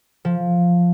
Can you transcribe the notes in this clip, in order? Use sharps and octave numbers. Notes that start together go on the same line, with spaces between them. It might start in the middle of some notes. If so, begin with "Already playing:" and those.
F3